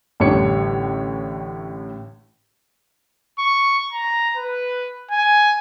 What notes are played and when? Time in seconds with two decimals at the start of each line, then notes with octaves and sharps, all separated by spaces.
0.20 A1 A2 D3 G3 C#5 C#7
3.39 C#6
3.93 A#5
4.37 B4
5.11 G#5